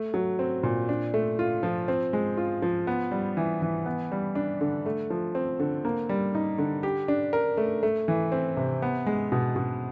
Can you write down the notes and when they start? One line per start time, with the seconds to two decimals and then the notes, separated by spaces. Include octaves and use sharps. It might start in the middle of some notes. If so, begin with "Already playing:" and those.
Already playing: A3
0.14 F#3
0.39 C4
0.63 A#2
0.89 D4
1.14 A3
1.39 F4
1.63 F3
1.88 C4
2.13 G#3
2.37 F4
2.62 F3
2.87 B3
3.11 G3
3.37 E3
3.62 E3
3.86 B3
4.12 G3
4.35 D4
4.61 D3
4.86 A3
5.10 F3
5.35 C4
5.59 D3
5.85 A#3
6.09 G3
6.35 D#4
6.58 D3
6.83 G4
7.08 D4
7.33 A#4
7.57 A3
7.83 A3
8.08 E3
8.32 C4
8.57 C3
8.82 B3
9.06 G#3
9.32 B2
9.56 B2